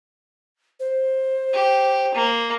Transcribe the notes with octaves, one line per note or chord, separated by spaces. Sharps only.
C5
G4
A#3